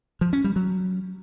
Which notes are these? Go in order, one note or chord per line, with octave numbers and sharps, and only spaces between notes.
F3
C#4
G3
F#3